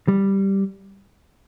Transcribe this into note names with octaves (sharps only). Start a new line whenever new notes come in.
G3